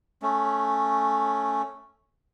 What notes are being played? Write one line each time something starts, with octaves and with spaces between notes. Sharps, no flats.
A3 C#4